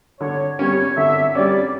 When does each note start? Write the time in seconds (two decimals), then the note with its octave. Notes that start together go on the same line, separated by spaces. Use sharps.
0.20 D3 C#5
0.59 G3 C#4 C#5
0.97 D3 E5
1.35 G3 C#4 D5